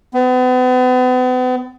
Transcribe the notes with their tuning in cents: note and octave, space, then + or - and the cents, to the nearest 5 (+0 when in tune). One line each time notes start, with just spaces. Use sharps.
B3 +40